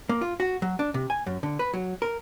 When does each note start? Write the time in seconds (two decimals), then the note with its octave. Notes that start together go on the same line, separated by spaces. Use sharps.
0.09 A#3
0.21 F4
0.40 F#4
0.62 F#3
0.79 D4
0.94 C3
1.10 G#5
1.27 F#2
1.43 D3
1.59 B4
1.74 F#3
2.02 A#4